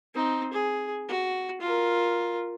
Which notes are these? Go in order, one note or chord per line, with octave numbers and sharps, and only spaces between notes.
C4 D#4
G#4
F#4
F4 A#4